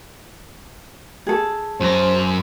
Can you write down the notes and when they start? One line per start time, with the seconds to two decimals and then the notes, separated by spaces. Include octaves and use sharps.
1.27 G#4 A4
1.80 F#2 C5 A#5